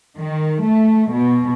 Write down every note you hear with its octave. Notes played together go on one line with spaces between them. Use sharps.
D#3
A3
B2